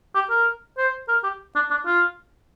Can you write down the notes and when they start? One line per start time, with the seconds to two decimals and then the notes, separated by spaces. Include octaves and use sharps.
0.15 G4
0.30 A#4
0.78 C5
1.08 A#4
1.23 G4
1.55 D4
1.70 D4
1.86 F4